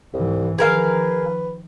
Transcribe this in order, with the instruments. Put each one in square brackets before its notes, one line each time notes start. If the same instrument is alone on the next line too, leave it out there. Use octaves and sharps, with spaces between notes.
[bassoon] C2 [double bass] G#2 E3
[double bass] D#3 F3 [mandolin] G#4 A#4 F5 [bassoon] B4